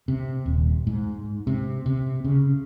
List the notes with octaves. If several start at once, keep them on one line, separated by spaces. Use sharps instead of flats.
C3
D#1
G#2
C3
C3
C#3